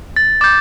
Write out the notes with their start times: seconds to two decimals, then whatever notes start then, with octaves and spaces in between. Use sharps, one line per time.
0.16 A6
0.41 D6 G6 A6